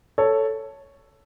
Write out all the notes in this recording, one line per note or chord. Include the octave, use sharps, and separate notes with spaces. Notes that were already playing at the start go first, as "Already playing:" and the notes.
A4 C#5